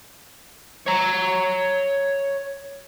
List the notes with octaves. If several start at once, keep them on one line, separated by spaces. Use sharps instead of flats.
C#5 A#5